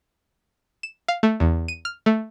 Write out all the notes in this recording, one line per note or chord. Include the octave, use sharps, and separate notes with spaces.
E7
F5
A3
E2
D#7
F6
A3